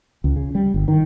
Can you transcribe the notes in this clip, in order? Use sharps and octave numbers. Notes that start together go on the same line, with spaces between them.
C#2
C#3
G3
G1
D#3